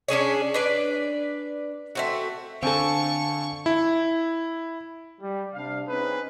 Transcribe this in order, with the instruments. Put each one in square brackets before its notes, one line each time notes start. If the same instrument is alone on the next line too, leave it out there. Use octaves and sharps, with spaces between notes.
[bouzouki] C#4 D4 G#4 C#5
D4 B4 D5
A3 C4 F#4
[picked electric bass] D3 [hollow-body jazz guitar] C4 A4 [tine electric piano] F5 G#5 A5 [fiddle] C#6
[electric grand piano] E4
[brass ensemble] G3
C3 D4 F5
C4 C#4 D#4 G#4 B4